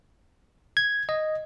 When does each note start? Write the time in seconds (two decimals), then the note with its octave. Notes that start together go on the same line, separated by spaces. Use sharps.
0.77 G#6
1.09 D#5